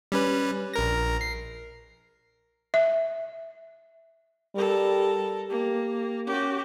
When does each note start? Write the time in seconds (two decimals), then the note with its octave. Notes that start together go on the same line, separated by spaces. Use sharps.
0.12 G3 C#4 B4
0.74 A#1 A#4 A#6
1.21 C7
2.74 E5
4.55 G3 A4 A#4
5.50 A#3 G4
6.27 C#4 F#4 G4